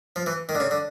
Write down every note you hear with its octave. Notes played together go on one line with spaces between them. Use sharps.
F3
E3
D#3
D3
C#3
D3